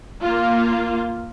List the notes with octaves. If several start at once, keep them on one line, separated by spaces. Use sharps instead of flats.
A#3 F4